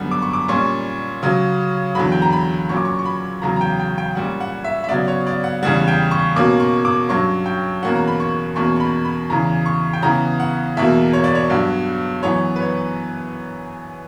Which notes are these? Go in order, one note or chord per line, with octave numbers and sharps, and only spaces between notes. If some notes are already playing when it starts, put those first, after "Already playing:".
Already playing: F#2 D3 G3 B3
D6
C#6
D6
A#2 G3 C#4 C#6
C#3 F#3 C#4
E2 D3 F#3 B5
G5
A#5
B5
A#2 F#3 C#4 C#6
D6
C#6
C#6
B5
E2 C#3 F#3 A#5
A#5
G5
G5
G5
A#2 G3 C#4 F#5
F#5
E5
E5
C#3 F#3 B3 D5
C#5
D5
F#5
E2 C#3 G3 F#5
G5
C#6
B2 A#3 C#4 D6
C#6
D6
G2 F#3 C#4 C#6
G5
E2 B2 A#3 C#4 F#5
A#5
B5
C#6
E2 B2 A#3 C#4 C#6
C#6
B5
B5
E2 C#3 E3 A#5
C#6
G5
C#3 E3 B3 A#5
F#5
E2 B2 A#3 E5
C#5
D5
C#5
G2 F#3 B3
F#2 E3 B3 C#5
B4
C#5